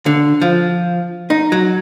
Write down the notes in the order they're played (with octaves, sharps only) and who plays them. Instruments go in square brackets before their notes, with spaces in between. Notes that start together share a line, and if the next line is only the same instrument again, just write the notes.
[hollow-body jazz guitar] D3
F3
D#4
F#3